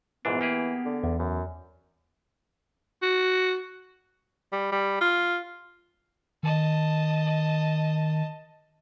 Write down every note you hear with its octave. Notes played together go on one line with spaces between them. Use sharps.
A#1 G#2 E3 B3 D4
A#3 G4 G#4
D3
E2
F#2
F#4
G3
G3
F4
D#3 D#5 A5